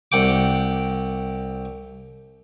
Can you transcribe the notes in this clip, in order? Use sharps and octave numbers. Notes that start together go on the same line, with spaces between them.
C2 F#5 G5 D6